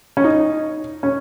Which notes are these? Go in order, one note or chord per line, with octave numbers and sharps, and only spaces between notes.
C#4
D#4
C#4